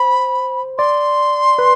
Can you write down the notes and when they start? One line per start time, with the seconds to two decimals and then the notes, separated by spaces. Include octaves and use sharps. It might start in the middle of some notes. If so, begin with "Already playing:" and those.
Already playing: C5 B5
0.78 D5 C6
1.59 B4